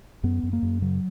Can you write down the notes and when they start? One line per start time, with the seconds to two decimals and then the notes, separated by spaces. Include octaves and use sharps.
0.23 F#2 B3
0.43 F#2
0.53 A#3
0.62 F#2
0.82 C#3 F#3